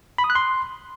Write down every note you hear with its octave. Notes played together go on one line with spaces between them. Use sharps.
B5
D#6
F#6
C6